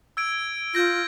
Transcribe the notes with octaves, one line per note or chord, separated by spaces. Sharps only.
E6 G#6 D7
F4 G6 A#6